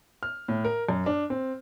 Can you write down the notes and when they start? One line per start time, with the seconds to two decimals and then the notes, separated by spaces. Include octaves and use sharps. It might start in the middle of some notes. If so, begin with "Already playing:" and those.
0.23 F6
0.48 A2
0.65 A#4
0.89 F#2
1.06 D4
1.30 C4